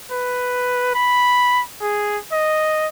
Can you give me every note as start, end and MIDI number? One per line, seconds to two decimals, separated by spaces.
0.12 0.93 71
0.95 1.62 83
1.82 2.18 68
2.32 2.87 75